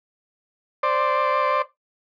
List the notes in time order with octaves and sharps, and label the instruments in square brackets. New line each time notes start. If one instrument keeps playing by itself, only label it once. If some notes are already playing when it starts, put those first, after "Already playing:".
[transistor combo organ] C5 D5